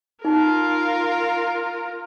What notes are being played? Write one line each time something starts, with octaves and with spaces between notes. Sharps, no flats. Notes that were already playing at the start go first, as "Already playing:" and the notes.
D#4 F4 A#4